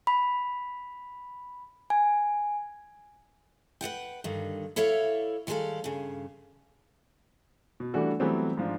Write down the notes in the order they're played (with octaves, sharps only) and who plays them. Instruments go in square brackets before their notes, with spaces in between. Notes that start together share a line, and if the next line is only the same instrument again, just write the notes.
[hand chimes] B5
G#5
[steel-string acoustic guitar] B4 D5 F#5 G5
G2 D3 D#3
E4 A4 C#5 D5 E5 F5
D#3 G3 G#3 G#4 A4 F5
G2 C#3
[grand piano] B2
E3 G3 A3 D4 F#4 A4
E3 F#3 G3 A3 B3 C4
G#2 F3 D4